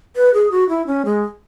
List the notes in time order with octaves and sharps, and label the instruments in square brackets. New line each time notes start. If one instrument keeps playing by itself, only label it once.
[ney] B4
G#4
F#4
E4
C#4
G#3